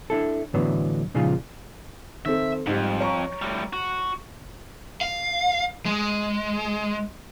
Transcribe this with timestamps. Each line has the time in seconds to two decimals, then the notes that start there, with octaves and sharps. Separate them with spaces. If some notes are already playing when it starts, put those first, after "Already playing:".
0.10 D4 E4 A4
0.54 A2 D3 E3 F#3 B3
1.14 A#2 C#3 F3 G#3 D#4 F4
2.25 D#3 C4 A4 E5
2.67 F2 G#2 G3
3.00 C#5 A#5 C#6
3.42 A2 G3
3.73 F#4
5.01 F5
5.86 G#3